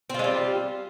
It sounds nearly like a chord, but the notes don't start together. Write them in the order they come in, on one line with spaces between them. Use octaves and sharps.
C4 F4 G#3 G3